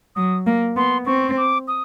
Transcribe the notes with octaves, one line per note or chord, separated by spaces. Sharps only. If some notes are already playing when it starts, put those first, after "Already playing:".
F#3 D#6
A#3
B3 C6
C4 C#6
D6
D#6